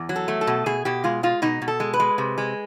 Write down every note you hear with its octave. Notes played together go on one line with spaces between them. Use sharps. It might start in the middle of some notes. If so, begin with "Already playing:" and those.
Already playing: E2
F#3
A4
A3
A4
B2
B2 G#4
B2 G4
G#3 F4
G#3 F4
B2 D#4
B2
A4
G#3
B4
G#3
C3
G#3